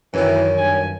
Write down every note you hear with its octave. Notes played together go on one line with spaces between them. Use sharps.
F#2 D#3 E3 C#5
G2 G#5